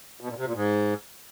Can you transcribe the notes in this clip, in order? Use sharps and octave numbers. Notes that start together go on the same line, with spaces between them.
B2
A#2
C3
A#2
G#2